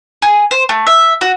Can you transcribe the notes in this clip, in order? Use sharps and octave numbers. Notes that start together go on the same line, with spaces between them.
G#4
C5
A3
E5
F#4